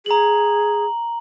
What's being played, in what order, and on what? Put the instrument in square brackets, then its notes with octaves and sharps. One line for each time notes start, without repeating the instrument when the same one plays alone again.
[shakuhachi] G#4 [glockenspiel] A#5 F#7